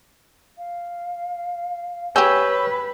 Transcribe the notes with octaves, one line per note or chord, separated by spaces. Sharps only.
F5
G4 G#4 B4 C#5 E6 G6